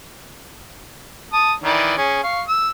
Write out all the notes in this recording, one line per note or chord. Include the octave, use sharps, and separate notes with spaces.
A5 D#6
D#3 E3 D5
C#4 G#4
F5 C#6
E6